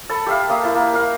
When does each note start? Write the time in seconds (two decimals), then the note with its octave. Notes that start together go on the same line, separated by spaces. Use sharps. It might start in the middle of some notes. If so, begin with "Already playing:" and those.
0.09 A4 A5 B5
0.26 G4 E5 F5
0.49 A#3 E5 D#6
0.63 E4 A5
0.75 A#3
0.94 A#4 F5